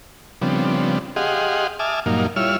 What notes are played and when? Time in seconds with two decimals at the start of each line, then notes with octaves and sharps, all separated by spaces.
0.42 C#3 F3 G3 B3 C4 D4
1.16 G4 G#4 D#5 F5 F#5 C6
1.79 E5 G#5 A5 D6 D#6 F6
2.06 G2 A#2 F#3 A#3 D#4 F5
2.36 G3 E4 F4 C#5 E6 F6